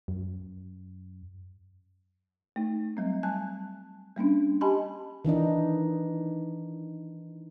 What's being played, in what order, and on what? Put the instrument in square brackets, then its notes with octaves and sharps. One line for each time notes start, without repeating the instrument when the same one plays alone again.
[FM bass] F#2
[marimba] A3 D#4
F#3 G3 C4
G3 G#5 A5 F#6
G3 A#3 C#4 D4
G4 D#5 G#5 A5 B5 C6
[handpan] D#3 E3 D4 D#4